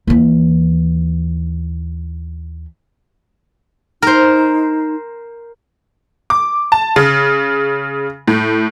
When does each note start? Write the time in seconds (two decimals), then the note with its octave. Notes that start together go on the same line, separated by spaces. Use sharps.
0.07 D#2 E3
4.02 D#4 A#4 C5
6.30 D6
6.72 A5
6.96 C#3
8.28 A2